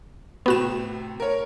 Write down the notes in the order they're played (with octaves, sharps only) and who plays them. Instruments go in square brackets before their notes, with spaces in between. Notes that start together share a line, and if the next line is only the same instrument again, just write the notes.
[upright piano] A2 C3 [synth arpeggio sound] B3 F#4 E7
[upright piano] A#4 C#5